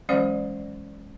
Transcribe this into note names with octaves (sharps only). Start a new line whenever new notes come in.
E3 F#3 G#3 C#4 C5 D5